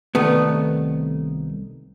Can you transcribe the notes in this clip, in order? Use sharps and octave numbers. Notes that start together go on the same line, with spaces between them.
C2 D#3 A3 B3